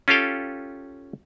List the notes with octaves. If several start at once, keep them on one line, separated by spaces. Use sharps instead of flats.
C#4 F4 G4 A4 F5 G5